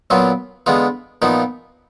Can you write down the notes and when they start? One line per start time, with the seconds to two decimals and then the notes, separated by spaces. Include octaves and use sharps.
0.10 A#2 F#3 B3 F4
0.66 D3 G#3 B3 F4
1.22 A#2 F3 B3 D#4